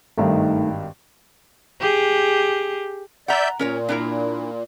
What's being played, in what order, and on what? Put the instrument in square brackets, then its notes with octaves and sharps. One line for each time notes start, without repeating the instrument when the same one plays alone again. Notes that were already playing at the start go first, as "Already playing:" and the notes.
[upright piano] G#1 G2 D#3 [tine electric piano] A3 D#4
[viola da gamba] G4 G#4
[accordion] D5 E5 G6 [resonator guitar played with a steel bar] F#5 A#5
[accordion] A#2 [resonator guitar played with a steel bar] C#4 A#4 C#5
[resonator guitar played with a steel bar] D4 E4 A#4